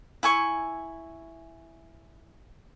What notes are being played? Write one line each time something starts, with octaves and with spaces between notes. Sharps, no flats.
E4 G#5 C#6